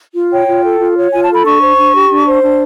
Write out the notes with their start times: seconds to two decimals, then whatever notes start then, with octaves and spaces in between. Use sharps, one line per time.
0.15 F4
0.31 C#5 G5
0.48 F4
0.64 A4
0.80 F4
0.97 C#5
1.13 F4 G#5
1.24 A5
1.29 A4
1.34 B5
1.45 D4 C#6
1.62 C5
1.77 D4
1.94 G4
2.10 D4
2.26 C5
2.43 D4